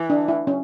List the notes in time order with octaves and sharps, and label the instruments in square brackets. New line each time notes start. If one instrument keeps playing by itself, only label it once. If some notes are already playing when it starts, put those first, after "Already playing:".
Already playing: [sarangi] E3
[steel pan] D4
E4
C#4